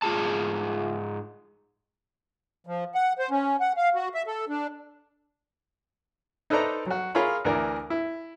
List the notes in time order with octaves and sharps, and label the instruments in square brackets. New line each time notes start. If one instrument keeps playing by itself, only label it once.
[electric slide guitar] G#2 F4 G#4 A5
[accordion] F3
F#5
C5
C#4
F#5
F5
F#4
E5
A4
D4
[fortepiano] D#4 A4 B4 C5 D5 A#5
F#3 F#4
F4 G#4 A#4 C#5 B5
D2 E3 A#4 D5
E4